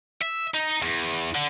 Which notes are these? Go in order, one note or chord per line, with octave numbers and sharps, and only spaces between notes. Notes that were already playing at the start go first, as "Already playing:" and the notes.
E5
D#4
E2
D3